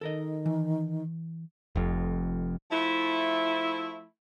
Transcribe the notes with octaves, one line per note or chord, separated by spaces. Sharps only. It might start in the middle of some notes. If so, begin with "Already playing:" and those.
D#3 A4 A#4 D#5
E3
F1 F2
F3 A3 E4